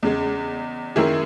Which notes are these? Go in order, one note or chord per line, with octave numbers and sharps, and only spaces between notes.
E2 C#3 G#3
F#2 D#3 A#3 E4 G#4